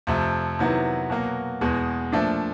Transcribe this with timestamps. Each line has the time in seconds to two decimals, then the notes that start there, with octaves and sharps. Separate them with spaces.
0.07 F2 C3 F3 A3
0.59 C3 D#3 F#3 B3 E4
1.10 B2 F#3 A#3
1.61 E2 B2 G#3
2.12 A#2 F3 A3 D4